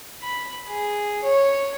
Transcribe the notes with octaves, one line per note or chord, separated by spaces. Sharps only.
B5
G#4
C#5